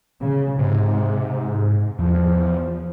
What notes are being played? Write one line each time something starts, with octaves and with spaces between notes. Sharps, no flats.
C#3
G#2 C3
E2 F3